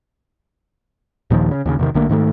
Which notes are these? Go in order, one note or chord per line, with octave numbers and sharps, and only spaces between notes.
D#2 A#2 D#3 F3
C#3
D#2 C#3
E2 C3 D#3
B1 D3 A3 A#3
G#2 D#3 F3 A3